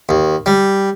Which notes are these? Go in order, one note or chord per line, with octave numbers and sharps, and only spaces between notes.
D#2
G3